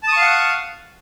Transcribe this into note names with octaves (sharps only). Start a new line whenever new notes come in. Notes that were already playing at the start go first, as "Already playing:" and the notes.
F5 F#5 A5 C#6 D#6